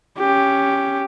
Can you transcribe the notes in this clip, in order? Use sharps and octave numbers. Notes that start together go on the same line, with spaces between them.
C#4 G4